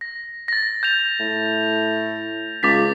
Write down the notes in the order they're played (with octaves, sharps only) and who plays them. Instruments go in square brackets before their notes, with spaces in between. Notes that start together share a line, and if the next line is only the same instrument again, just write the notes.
[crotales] A#6
A6 A#6
G6 A6 F7
[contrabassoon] A2
[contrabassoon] C#2 [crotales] D6 A6 B6